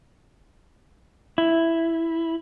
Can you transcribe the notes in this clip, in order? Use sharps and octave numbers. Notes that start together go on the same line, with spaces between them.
E4